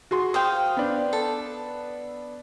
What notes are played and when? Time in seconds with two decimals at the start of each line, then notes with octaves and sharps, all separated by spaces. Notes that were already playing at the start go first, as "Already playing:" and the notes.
0.11 F#4 G#4 C6
0.34 C5 F5 G5 D#6
0.77 B3 D4
1.13 A4